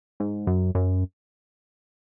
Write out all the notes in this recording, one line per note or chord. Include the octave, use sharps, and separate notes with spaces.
G#2
F#2
F#2